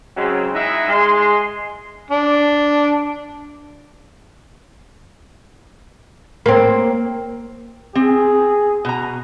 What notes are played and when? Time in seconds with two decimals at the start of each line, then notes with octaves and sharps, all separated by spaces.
0.17 C#3 F#3 G#3 C4
0.54 G#3 D#4 E4 D#5 E5 F#5
0.88 G#3 C6
2.11 D4
6.46 A#3 C4
7.95 C4 G#4
8.85 B2 A#5